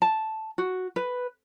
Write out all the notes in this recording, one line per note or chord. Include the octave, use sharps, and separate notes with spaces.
A5
F#4
B4